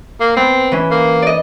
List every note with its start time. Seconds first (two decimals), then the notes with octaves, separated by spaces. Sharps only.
0.21 A#3
0.37 B3 C4
0.72 E3 C#4
0.91 A#3
1.22 D5 D#5